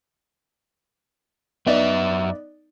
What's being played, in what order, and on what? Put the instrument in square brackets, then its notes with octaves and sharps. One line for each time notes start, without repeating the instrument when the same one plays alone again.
[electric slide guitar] F#2 E5 [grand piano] B3 D#4 D5